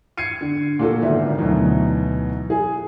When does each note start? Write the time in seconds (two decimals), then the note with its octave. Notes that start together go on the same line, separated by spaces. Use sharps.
0.17 G#6 C7 C#7 D#7
0.41 D3
0.79 A#2 F#4 A4
1.02 G1 G#2 D#3 D5 E5
1.38 D2 B2 E3 F#3 D#4
2.50 G#4